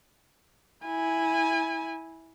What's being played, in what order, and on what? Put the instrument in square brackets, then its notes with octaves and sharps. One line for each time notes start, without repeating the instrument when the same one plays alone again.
[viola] E4 G#5